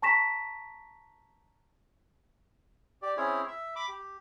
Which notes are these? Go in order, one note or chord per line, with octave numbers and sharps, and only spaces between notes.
A5 A#5 C#6 A#6 B6 E7
G4 D5
C4 C#4 E4 G#4 C#5
E5
B5 D6
G4